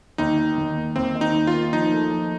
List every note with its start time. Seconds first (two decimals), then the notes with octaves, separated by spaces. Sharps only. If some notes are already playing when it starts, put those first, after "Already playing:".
0.18 D#2 D#4
0.38 D#3
0.58 D#2
0.77 A#3
0.96 D#2 C4
1.15 D#3
1.21 D#4
1.35 D#2
1.47 F4
1.54 A#3
1.73 F3 D#4
1.92 A3
2.11 F3